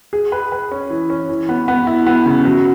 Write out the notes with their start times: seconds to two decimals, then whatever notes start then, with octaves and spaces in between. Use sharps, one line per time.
0.13 G#4
0.32 B4
0.52 B4
0.72 C#4
0.90 E3
1.10 C#4
1.29 E3
1.49 B3
1.68 B3
1.87 E4
2.06 B3
2.26 C#3
2.45 F#3